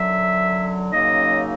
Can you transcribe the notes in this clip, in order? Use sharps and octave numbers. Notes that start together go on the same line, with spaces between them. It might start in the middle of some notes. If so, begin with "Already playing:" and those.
Already playing: F#2 D3 F#3 E5
F#2 C#3 F#3 A#3 D#4 D#5